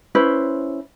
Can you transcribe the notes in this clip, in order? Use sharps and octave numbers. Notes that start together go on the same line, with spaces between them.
C#4 E4 B4 C5